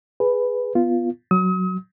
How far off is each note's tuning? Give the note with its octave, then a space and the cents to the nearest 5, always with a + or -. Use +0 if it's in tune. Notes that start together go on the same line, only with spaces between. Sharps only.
G#4 +0 B4 +0
B3 +0 F4 -10
F#3 +0 D#6 +40